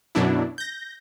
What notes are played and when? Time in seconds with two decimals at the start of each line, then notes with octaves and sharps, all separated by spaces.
0.15 F#2 B2 F#3 D4 E4
0.58 G6 A#6